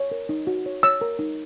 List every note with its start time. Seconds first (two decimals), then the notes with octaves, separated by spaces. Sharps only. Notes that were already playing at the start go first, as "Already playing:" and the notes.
Already playing: C#5
0.11 A#4
0.29 D#4
0.47 F#4
0.66 C#5
0.83 C#5 E6
1.01 A#4
1.19 D#4